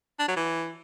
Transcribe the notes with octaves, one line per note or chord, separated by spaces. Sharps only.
D4
F#3
E3